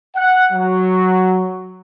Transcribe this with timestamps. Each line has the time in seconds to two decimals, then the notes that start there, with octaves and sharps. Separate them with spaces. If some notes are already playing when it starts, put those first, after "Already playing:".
0.16 F#5
0.53 F#3